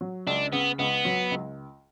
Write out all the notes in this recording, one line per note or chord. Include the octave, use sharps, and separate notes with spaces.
F#3
C#2 D4
C#3 B3
C#2 B3
F#3
C#2